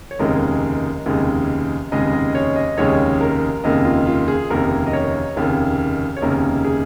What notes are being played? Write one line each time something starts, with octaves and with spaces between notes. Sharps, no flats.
C#5
F1 D#2 C#3 G#3 A#4
F1 D#2 C#3 G#3
F1 D#2 C#3 G#3 D#5
D#5
C#5
D#5
F1 D#2 C#3 G#3 C#5
A#4
F1 D#2 C#3 A#3 D#5
F4
F4
G#4
F1 D#2 C#3 A#3 A#4
D#5
C#5
F1 D#2 C#3 A#3
C#5
F1 D#2 C#3 A#3 A#4
G#4